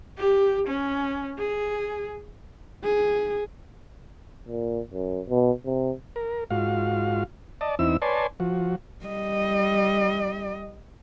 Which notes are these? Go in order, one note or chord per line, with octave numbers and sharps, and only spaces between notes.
G4
C#4
G#4
G#4
A#2
F#2
B2
C3
A#4
G#2 F4 F#4 F5
D5 D#5 A5
E2 C4 D#4 E4 E6
B4 C#5 D5 G#5 A5 C6
F3 F#4
G3 D#5